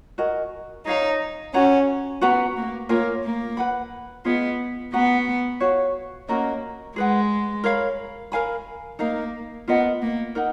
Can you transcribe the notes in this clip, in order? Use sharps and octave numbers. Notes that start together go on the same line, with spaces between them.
F#4 A#4 D#5 G#5
D#4 G#4 C#5 F5 A#5
C#4 F#4 C#5 F#5 A#5
B3 F#4 B4 F#5 A#5
A#3
A#3 F4 A#4 C#5 G#5
A#3
B4 F#5 B5
B3 F4 G#4 D#5
B3 F#4 B4 F#5 A#5
F#4 C#5 F5
A#3 C#4 F#4 A#4 D#5
G#3 G#4 B4 F#5
A#4 C#5 F5 B5
A#4 F5 G#5 B5
A#3 D#4 A#4 F5
B3 F4 A#4 D#5 F#5
A#3
D#4 A#4 D#5 F#5